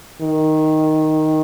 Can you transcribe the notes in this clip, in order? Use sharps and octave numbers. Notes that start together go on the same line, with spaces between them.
D#3